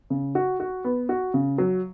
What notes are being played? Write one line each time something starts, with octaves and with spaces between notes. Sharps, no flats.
C#3
F#4
F#4
B3
F#4
C#3
F#3